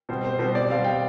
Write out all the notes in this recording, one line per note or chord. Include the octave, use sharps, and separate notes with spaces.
B2 G3 C4 C5
C5
B2 G3 C4 C5
D5
B2 G3 C4 F5
G5